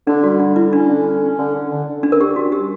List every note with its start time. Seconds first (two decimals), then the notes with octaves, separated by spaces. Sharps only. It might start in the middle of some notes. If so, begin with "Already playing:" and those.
0.07 D3 D4
0.23 G3 F#4
0.39 D3 D4
0.56 G3 E4
0.72 C#4 D4
0.88 D3
1.06 C#4
1.22 C#4
1.38 D3
1.54 D3
1.71 D3
1.87 D3
2.03 C#4 D4
2.12 A#4
2.20 G3 G4
2.36 C#4 F#4
2.52 G3 G4